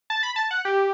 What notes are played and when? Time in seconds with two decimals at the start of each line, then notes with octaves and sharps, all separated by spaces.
0.10 A5
0.23 B5
0.36 A5
0.51 F#5
0.65 G4